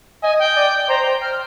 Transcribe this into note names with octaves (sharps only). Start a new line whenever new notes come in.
D#5 G#5
G5
D5
C5 A#5
G5
F6